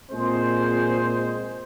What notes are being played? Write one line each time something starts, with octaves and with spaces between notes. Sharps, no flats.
A#2 G#3 C4 G#4 C5